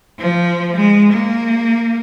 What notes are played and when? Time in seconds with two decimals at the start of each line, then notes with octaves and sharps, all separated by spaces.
0.20 F3
0.77 G#3
1.13 A#3